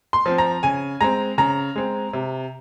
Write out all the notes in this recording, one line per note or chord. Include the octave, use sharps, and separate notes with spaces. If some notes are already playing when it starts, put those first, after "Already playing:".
C6
F3 C4
A#5
C#3 G#5
G#3 C4 A#5
C#3 A#5
G#3 C4
C3